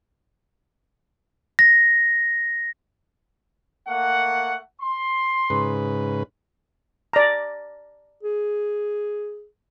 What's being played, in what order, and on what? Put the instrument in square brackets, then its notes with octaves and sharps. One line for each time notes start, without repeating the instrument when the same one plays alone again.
[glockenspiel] A#6
[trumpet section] A3 A#3 F#5
C6
[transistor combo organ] G#2 C#3 B4
[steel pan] D5 A#5
[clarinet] G#4